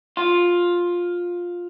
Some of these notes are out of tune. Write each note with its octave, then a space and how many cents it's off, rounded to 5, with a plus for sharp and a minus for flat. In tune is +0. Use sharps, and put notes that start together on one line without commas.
F4 +10